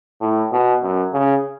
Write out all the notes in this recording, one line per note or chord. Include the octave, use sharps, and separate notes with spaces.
A2
B2
F#2
C#3